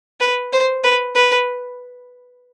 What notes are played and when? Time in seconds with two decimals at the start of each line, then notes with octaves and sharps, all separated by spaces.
0.20 B4
0.53 C5
0.84 B4
1.15 B4